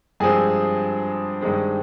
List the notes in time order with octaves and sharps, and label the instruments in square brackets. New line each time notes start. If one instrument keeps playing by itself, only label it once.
[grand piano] G2 F3 G#3 C4 G#4 G#5
G2 D#3 G#3 C4